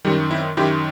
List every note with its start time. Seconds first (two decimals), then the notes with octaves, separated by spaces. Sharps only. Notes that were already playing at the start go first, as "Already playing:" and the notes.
0.05 F#2 D#3 G3
0.31 C4 E4
0.57 F#2 D#3 E4 G4